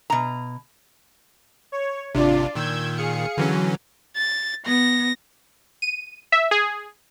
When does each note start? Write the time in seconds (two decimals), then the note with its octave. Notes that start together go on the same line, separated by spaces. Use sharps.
0.10 B2 A#5
1.72 C#5
2.15 G#1 C3 D4 F4 D5
2.55 A#2 D#3 E6 G6 G#6
2.97 G#4 F5 C#7
3.38 D3 E3 F#3 C#4
4.17 A6
4.66 B3 A#6
5.82 D#7
6.32 E5
6.51 G#4